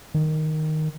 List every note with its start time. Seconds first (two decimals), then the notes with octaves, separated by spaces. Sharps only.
0.15 D#3